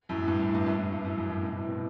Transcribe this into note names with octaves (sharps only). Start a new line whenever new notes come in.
F#2 A2
A2
G2
F#2
G2
F#2 A2
G2
G2
F#2 A2
F#2 A2
F#2 A2
G2 B2
A2 C3
B2